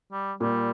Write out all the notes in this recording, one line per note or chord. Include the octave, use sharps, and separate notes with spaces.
G3
A#2 G3